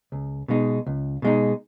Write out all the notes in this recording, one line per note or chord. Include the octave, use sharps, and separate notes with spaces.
C#2
B2 G#3 D#4
C#2
B2 G#3 D#4